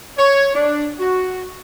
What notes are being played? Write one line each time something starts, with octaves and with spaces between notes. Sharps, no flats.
C#5
D4
F#4